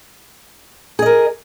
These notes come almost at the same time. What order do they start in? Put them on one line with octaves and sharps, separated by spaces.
G#4 D#5 A#4